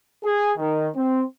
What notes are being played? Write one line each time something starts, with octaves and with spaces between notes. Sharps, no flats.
G#4
D#3
C4